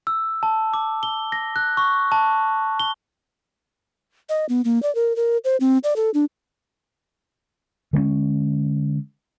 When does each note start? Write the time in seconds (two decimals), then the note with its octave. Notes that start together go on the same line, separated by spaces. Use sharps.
0.07 E6
0.43 A5
0.74 D6
1.03 G7
1.32 A#6
1.56 F#6
1.77 C#6
2.12 A5
2.80 G7
4.29 D#5
4.49 B3
4.65 A#3
4.83 D5
4.95 A#4
5.16 A#4
5.44 C5
5.60 C4
5.84 D5
5.96 A4
6.14 D4
7.93 D3 G#3 B3 C#4